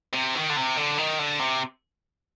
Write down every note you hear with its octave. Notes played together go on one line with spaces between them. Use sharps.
C3
D#3
D3
C3
D3
D#3
D3
C3